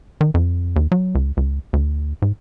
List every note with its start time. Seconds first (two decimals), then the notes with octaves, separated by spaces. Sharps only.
0.21 D#3
0.34 F2
0.76 D#2
0.92 F#3
1.15 C#2
1.37 C#2
1.73 D2
2.22 G#2